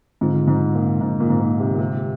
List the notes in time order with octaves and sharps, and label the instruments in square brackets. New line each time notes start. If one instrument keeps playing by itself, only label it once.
[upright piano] G#2 [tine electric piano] D3 G#3 C4 F4
[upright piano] G#2
A#2
G#2
A#2
G#2
A#2
C3
A#2
C3